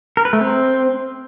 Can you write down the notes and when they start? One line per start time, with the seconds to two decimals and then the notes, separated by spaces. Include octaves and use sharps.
0.17 A#4
0.25 B4
0.33 A3
0.41 C4